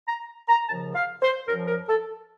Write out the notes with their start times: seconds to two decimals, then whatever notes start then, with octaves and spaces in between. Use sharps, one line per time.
0.08 A#5
0.48 A#5
0.68 D#2 C#3 F3 A5
0.94 F5
1.22 C5
1.48 F#2 F3 A#4
1.67 A#4
1.88 A4